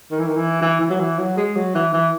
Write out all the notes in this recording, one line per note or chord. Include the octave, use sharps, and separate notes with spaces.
D#3
E3
D#3
E3
E3
E3
F#3
E3
F#3
G#3
F#3
E3
E3